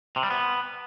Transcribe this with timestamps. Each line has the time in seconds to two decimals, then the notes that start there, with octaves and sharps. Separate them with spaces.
0.16 C3
0.23 G3
0.30 B3